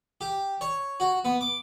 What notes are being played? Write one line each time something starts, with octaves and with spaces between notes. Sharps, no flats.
G4
C#5
F#4
B3
D6